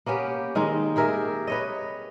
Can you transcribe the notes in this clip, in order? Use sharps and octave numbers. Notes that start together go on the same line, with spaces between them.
A#3 B3 C#4 G4
D#3 G#3 C4 D#4
G4 G#4 A#4 E5
B4 C#5 D#5